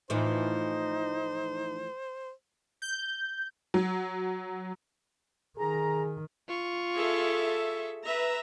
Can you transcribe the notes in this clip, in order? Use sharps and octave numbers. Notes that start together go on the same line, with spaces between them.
A2 E3 F3 D#4 C5
G6
F#3
D#3 G#4 A#5
F4 C#6
G#4 A4 E5
B4 E5 A#5